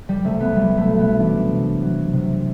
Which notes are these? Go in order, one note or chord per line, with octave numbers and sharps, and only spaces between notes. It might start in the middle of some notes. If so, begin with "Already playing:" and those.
G3
C2 A3
B3
F#3 G3
A3
B1
B3
E3 D4
C3
F#3
C3